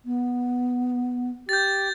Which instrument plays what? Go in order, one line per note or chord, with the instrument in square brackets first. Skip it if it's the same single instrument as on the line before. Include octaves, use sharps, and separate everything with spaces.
[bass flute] B3
[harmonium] G4 [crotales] G6 A6